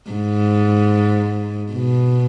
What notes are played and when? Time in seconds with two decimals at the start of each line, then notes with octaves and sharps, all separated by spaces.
0.11 G#2
1.73 B2